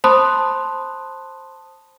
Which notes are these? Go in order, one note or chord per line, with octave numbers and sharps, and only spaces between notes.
C5 A5 B5 C6 D#6 F#6